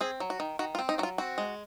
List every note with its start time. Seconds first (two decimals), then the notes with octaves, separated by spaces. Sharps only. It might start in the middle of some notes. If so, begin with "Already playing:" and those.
0.01 C4 G#4
0.20 F#3
0.30 F#4
0.40 D#3
0.59 D#3 F#4
0.75 F4
0.79 C4
0.89 D#4
0.98 F#3 F#4
1.03 F4
1.18 C4 F#4
1.38 G#3